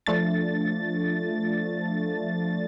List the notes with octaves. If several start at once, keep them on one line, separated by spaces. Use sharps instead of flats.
F3 A3 D4 A6